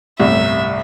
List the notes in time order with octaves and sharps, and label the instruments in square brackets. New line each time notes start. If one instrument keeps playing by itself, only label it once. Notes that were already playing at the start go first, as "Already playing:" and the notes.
[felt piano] G1 C2 A2 [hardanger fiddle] E5